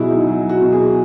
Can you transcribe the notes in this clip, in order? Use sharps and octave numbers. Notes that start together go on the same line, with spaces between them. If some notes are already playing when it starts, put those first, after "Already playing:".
Already playing: B2 F#3 E4 F#4 G#4
D#4
F#3
F#4
B2
G#4